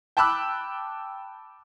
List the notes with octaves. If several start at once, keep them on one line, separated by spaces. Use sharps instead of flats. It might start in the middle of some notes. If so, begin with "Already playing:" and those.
G5 A5 B5 D6 E6 F#6